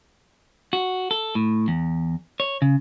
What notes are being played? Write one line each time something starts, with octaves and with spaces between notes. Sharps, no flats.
F#4
A4
A2
E2
C#5
C#3